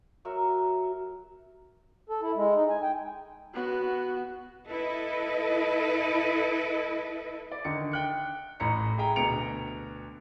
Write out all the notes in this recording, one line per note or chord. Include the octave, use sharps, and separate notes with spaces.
F#3 F#4 A#4 E5
A4
E4
G#3
D#4
G#5
G5
B3 F#4
E4 A4 B4 D#5
D5
D3 D#3 C#7
G5 F#6 C#7
A1 A2 A#5 C#7
G#4 E5 G5 A#5
D2 B2 A#5 C#7 D7 F7